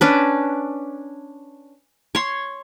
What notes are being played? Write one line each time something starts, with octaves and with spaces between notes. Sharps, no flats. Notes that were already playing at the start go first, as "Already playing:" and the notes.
C#4 D4 B4
C#5 C6